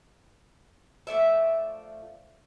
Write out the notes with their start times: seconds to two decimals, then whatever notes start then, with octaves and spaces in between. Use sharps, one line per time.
1.07 F3 A3 D5 E5